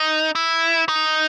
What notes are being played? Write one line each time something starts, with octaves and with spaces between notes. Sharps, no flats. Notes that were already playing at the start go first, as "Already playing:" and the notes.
Already playing: D#4
E4
D#4